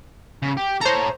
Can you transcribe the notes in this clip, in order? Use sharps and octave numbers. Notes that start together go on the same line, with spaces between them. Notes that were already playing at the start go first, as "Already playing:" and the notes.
C#3
G4
A4 C5 C#5 A#5